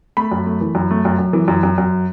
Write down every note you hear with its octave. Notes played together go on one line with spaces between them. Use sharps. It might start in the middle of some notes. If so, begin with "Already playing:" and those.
A3 B5
F#2
A3
E3
F#2
A3
F#2
F#2
E3
F#2
F#2
F#2